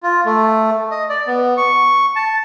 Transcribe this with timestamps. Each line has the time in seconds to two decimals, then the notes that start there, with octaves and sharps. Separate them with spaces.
0.03 F4
0.25 A3
0.91 D#5
1.09 D5
1.27 B3
1.57 C#6
2.16 A5